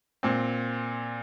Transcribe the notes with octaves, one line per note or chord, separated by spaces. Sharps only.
A#2 C4